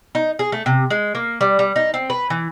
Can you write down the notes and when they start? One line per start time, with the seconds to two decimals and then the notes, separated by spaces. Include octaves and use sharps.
0.15 D#4
0.39 G#4
0.52 A3
0.66 C3
0.90 G#3
1.15 A#3
1.41 G3
1.59 G3
1.76 D#4
1.94 C4
2.10 B4
2.30 E3